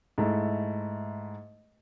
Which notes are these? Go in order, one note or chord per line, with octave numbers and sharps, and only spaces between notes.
G#2 A3 E4